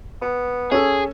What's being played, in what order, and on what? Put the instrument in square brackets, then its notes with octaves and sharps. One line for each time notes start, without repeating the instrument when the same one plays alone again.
[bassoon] B3
[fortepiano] C#4 A4 [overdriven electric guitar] G#4